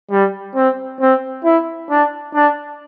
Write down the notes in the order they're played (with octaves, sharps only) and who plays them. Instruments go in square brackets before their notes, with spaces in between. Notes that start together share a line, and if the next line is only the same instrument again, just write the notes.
[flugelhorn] G3
C4
C4
E4
D4
D4